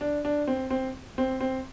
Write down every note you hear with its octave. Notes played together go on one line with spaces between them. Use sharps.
D4
D4
C4
C4
C4
C4